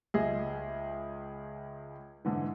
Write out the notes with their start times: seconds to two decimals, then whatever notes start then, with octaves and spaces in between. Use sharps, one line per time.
0.14 C#2 G#4 D#5 E5
2.25 G#2 D3 E3